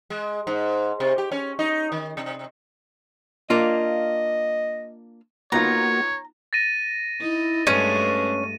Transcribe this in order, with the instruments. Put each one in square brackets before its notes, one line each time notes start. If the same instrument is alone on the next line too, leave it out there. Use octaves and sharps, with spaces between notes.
[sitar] G#3
G#2
C3
G4
C#4
D#4
D#3
C3
[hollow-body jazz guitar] A#3 D4 F4 [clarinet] D#5
[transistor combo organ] A#3 F#4 [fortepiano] B3 D#4 F4 [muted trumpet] C#5 [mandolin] A#5
[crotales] A6 A#6 D#7
[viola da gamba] D#4 [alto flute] E4
[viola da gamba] G2 G#3 A3 [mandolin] C#4 [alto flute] B4 [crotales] D#7